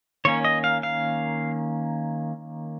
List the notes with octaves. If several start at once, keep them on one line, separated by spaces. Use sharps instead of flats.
D#3 A#3 C#4 C#5
D#5
F5
F5